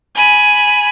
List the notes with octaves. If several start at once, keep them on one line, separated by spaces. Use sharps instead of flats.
G#5 B5